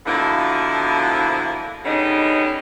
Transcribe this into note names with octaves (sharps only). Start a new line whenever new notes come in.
B2 D3 F3 A#3 E4
D3 G3 G#3 B3 C#4 D#4